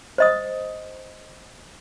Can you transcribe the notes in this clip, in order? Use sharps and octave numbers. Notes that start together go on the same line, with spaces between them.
C5 D#5 D#6